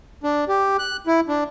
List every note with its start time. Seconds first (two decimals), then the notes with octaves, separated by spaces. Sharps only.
0.24 D4
0.49 G4
0.79 F#6
1.07 E4
1.28 D4